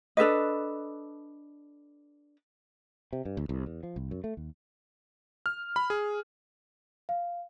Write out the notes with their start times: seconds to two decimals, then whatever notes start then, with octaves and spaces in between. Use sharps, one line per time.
0.17 D4 A4 B4 D#5
3.13 C3
3.25 G2
3.37 D2
3.49 C2
3.66 E2
3.83 F3
3.96 C2
4.11 F#2
4.24 A3
4.37 D#2
5.46 F6
5.76 B5
5.90 G#4
7.09 F5